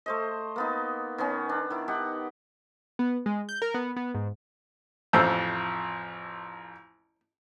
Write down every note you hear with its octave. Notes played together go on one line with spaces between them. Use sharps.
A3 C5 D#5
A#3 B3 D#4
D#3 B3 C#4
D4
D#3 E4
D#4 G4 F#5
B3
G#3
G6
A#4
B3
B3
G#2
A1 F2 C5 E6